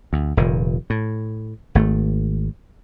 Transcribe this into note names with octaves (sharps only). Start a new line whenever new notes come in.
D2
F1 A#2 D#3
A2
G#1 A3